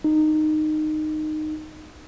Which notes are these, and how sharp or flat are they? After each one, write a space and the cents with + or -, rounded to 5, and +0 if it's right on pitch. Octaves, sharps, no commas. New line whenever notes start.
D#4 -15